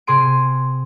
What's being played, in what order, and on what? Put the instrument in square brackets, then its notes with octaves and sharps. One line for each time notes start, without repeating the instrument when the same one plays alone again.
[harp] C3 G#4 C6 D7